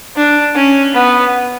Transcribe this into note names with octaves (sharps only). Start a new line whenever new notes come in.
D4
C#4
B3